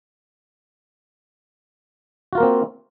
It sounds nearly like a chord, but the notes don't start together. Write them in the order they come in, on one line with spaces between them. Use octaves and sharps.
F#4 F4 A#4 A#3 C4